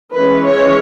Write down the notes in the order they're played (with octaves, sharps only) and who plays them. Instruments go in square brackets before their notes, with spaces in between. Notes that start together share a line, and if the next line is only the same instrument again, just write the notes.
[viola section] E3 G#3 C#4 B4
C#5